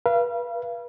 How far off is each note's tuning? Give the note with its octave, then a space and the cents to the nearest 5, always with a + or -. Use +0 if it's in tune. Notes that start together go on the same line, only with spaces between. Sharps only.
B4 -35 F5 -35